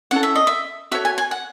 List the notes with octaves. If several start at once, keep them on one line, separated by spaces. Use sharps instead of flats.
C#4 E4 A4 F#5
E5
D#5
E5
F#4 A4 C#5 E5
G#5
G#5
F#5